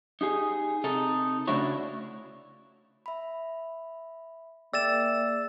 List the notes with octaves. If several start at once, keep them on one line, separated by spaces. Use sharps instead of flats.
D#4 G4 G#4
C3 D#4 A4
C#3 A3 D4 E4 F#4 C#5
E5 B5
A#3 G#4 D5 E5 G5 E6 A6 E7